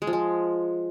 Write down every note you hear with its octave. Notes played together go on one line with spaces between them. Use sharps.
G#3
F3
G#3